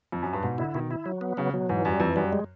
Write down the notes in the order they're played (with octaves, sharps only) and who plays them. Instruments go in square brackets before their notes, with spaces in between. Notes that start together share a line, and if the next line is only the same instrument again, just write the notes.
[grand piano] F2
F#2
G2
[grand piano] G#2 [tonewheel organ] B2
[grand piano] D3 [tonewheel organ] E4
[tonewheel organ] B2 [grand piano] D#3
[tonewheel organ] E4
F#3
B3
[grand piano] C#3 [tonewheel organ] F#3
[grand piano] B2 [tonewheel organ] F#3
[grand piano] G#2 [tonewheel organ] E3
[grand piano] F#2 [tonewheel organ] G3
[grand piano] F2 [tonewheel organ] E3
[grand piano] F#2 [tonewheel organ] G3
[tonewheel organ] G#3